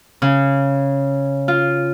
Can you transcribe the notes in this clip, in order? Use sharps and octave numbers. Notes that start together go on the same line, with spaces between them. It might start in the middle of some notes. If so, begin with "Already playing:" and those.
C#3
F4